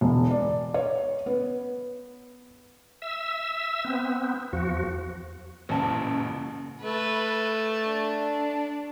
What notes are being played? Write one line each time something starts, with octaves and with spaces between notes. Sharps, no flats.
E1
D5
C#5
B3
E5 E6
B3 C4
E2 F3 F#4
A1 F#2 A#2 C#3 E3 A5
A3 B4
D4